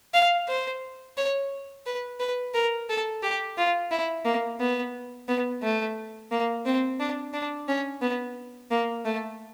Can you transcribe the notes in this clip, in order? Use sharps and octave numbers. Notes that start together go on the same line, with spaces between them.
F5
C5
C#5
B4
B4
A#4
A4
G4
F4
E4
A#3
B3
B3
A3
A#3
C4
D4
D4
C#4
B3
A#3
A3